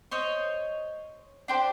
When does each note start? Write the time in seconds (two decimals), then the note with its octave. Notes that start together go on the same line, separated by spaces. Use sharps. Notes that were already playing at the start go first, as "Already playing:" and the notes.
0.11 C5 C#5 D#5
1.48 D4 G4 C5